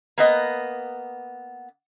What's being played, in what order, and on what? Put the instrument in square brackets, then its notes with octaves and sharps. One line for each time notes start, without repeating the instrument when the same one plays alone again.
[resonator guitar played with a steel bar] A#3 B3 D#5